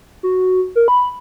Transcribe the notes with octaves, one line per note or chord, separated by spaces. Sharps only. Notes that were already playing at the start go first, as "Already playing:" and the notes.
F#4
A#4
B5